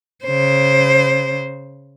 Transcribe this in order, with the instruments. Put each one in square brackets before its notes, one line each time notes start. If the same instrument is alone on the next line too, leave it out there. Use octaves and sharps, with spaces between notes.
[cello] C#3 C5